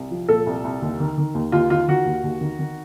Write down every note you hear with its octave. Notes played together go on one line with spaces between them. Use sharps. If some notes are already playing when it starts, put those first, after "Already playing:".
Already playing: C2
F3
A#2 A4
C2
C2
D#2
D#3
D#3
D#2
D#2 F4
D#3 F4
D#3 F#4
D#2
D#2
D#3
D#3